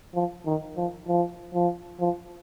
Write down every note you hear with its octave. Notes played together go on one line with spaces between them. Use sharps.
F3
D#3
F3
F3
F3
F3